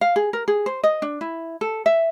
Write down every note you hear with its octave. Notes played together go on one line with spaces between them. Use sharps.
F5
G#4
A#4
G#4
C5
D#5
D4
E4
A4
E5